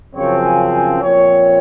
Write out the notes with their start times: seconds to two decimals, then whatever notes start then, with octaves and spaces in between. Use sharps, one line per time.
0.15 F#2 C#3 F3 C4 C#5
0.44 G#5
0.73 G#5
1.01 A#2 F3 C4 C#5